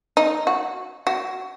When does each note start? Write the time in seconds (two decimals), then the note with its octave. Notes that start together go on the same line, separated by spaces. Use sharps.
0.17 D#4
0.47 F#4
1.07 F#4